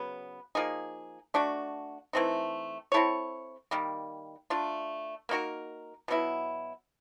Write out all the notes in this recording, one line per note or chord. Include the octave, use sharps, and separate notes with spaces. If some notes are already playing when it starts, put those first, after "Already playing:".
Already playing: C#3 F#3 B3
F3 A#3 D#4 G#4
A3 D4 F#4
E3 A3 C4 D#4
C4 E4 A4 C#5
D#3 G3 A#3
A3 D4 F4
A#3 D#4 F#4 A#4
B2 F#3 B3 E4